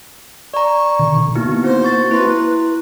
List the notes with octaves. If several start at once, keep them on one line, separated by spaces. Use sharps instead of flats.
D5 A#5 C#6
B2 D3 D#3
A#3 B3 D#4 E4 F#4
C4 C5
C#6 A6
E4 B4 C6